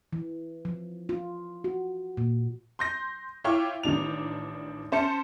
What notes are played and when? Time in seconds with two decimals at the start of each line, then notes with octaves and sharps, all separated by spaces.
0.13 E3
0.65 F3
1.09 F4
1.64 F#4
2.17 A#2
2.79 C6 G6 A#6
3.44 E4 F4 C#5 G5 C#6 D6
3.83 A1 D#3 D4 F7
4.92 C#4 C5 A5 C#7